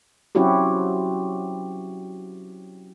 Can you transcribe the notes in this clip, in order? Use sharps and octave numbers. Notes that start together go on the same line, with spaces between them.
F#3 C4 C#4 E4 F#4 G4